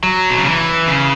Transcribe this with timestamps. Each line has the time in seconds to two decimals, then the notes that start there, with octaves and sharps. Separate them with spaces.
0.03 F#3
0.30 B2
0.38 C#3
0.46 E3
0.87 C#3